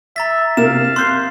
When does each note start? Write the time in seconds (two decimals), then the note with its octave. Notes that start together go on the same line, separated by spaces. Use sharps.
0.16 E5 A#5 A6 B6
0.57 C3 A#4 F5 E7
0.96 C6 F#6 G6 C7